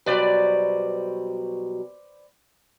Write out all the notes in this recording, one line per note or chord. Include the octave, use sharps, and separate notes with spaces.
B2 F#3 G3 B4 C5 D5